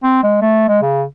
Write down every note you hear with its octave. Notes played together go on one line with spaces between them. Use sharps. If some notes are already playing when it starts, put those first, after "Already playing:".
C4
G#3
A3
G#3
C#3